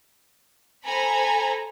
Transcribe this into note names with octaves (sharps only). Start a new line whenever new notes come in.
A4 C5 G#5 A#5 B5